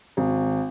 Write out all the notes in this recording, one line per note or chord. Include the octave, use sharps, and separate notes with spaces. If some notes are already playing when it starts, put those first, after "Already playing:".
G#1